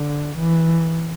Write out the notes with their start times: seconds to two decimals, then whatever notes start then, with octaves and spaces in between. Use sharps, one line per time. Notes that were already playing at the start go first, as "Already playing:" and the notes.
Already playing: D3
0.36 E3